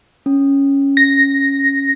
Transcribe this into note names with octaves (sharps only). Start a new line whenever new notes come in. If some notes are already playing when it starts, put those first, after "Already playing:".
C#4
A#6